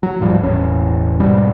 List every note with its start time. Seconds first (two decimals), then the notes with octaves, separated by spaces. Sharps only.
0.03 F#3
0.20 D1 G#2 F3 G3
0.40 E1 A1 C#4
1.20 G#2 B2 G3